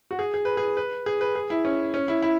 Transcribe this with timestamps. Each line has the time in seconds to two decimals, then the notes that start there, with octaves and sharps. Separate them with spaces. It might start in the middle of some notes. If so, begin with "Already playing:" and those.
0.11 F#4
0.19 G#4
0.34 G#4
0.45 B4
0.57 G#4
0.77 B4
1.06 G#4
1.21 B4
1.35 G#4
1.50 E4
1.65 C#4
1.94 C#4
2.08 E4
2.23 E4